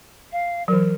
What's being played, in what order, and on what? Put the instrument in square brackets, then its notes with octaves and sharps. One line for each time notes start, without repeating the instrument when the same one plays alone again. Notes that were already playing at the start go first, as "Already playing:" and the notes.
[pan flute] F5
[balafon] E3 F#3 [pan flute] A#4